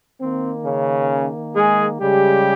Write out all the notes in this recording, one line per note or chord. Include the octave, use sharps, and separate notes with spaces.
D#3 A#3 C4
C#3 C#4
G#3 G#4
C#3 G3 G#3 G4